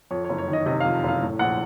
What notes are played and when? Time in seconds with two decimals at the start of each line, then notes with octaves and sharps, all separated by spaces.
0.11 F2 C#5
0.24 C#5
0.29 F#1
0.38 C#5
0.48 D#3
0.53 D#5
0.66 C3 D#5
0.80 F2 F5
1.04 F#1 F5
1.22 A2
1.39 A#1 F#5